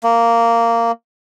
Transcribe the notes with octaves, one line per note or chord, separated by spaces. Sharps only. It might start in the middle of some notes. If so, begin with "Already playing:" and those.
A#3